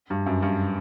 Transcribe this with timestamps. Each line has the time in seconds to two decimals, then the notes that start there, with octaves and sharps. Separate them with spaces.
0.10 G2
0.26 F#2
0.42 G2